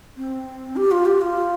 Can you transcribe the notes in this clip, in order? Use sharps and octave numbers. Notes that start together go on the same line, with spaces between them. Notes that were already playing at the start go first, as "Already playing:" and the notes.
C4
G4
F4
G4
F4